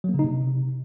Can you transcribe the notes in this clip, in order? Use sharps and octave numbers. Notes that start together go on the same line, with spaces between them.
F#3
A#3
C#3
D#4
C3